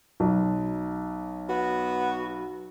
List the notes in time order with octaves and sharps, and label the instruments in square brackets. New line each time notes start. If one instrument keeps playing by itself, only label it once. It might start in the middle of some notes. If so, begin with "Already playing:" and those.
[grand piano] B1
[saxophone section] B3 F#4